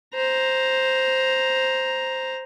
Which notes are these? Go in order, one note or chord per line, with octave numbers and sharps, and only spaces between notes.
C5 A#5